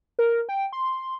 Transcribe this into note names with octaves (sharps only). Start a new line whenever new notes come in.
A#4
G5
C6